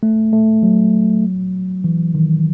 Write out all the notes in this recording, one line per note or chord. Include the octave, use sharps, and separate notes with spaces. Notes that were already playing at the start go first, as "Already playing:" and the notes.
A3
A3
F#3
E3
D#3